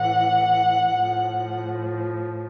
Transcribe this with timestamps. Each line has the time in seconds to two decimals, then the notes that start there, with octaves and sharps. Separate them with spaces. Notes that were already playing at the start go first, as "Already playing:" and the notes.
Already playing: A2 E3 F#5
0.99 A2 F3